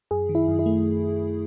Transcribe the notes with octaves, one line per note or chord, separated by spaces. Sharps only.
F#2 G#4
D#3
E4
F#2
E4
A3